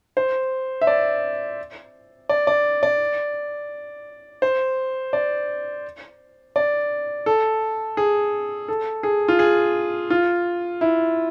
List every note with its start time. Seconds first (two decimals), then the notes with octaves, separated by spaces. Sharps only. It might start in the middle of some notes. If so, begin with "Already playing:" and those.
0.17 C5
0.81 E5
0.87 D5
2.29 D5
2.47 D5
2.83 D5
4.42 C5
5.13 D5
6.56 D5
7.26 A4
7.97 G#4
8.68 A4
9.03 G#4
9.28 F4
9.39 G#4
10.10 F4
10.81 E4